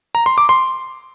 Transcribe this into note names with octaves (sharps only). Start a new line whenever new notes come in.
A#5
C6
D6
C6